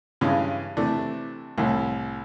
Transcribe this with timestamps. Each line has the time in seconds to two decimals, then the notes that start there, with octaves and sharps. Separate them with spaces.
0.21 G2 C#3 E3 G#3
0.77 C3 E3 A3 D4
1.58 C2 A2